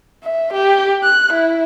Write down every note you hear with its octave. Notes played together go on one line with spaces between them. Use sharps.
E5
G4
F#6
E4